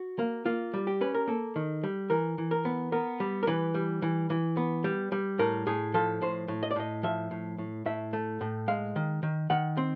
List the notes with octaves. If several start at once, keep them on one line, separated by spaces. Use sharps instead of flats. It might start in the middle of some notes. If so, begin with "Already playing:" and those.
Already playing: F#4
A#3
A#3 F4
G3
G4
C#4 B4
A#4
A#3 A4
D#3
G3
E3 A#4
E3
A#4
B3
B3 A#4
G3
A#4
E3 B4
G3
E3
E3
B3
G3
G3
A2 A#4
A2 G#4
F3 A4
A2 C5
A2
D#5
D5
A2 D#5
F3 E5
A2
A2
A2 E5
A3
A2
G#3 F5
D#3
D#3
D#3 F#5
C4